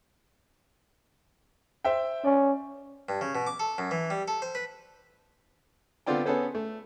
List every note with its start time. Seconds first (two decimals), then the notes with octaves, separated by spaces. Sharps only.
1.85 C5 E5 G5
2.24 C#4 D5
3.09 G2
3.21 C#3
3.35 B2
3.47 D6
3.60 A4
3.78 F#2
3.91 E3
4.10 G3
4.28 A4
4.42 C5
4.55 B4
6.06 D3 B3 C4 F4 D5 G5
6.26 B3 C#4 G#4 A4 B4 C5
6.55 A3